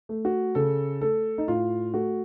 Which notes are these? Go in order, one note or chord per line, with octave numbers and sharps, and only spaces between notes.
A3
F#4
C#3 A4
A3 A4
D#4
A2 F4
A3 F#4